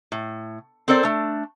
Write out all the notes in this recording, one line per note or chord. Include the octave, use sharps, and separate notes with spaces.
A2
C4 A4 A#4 C5 D5
A3 D4